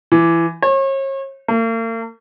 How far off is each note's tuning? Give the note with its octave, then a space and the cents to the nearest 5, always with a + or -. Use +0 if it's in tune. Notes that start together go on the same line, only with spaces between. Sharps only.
E3 +20
C#5 -40
A#3 -45